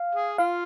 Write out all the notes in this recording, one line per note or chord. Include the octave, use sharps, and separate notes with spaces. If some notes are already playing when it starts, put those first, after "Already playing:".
Already playing: F5
G#4
F4 F5